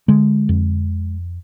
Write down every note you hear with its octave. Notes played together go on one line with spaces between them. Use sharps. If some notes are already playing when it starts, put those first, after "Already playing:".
D3 G#3
F2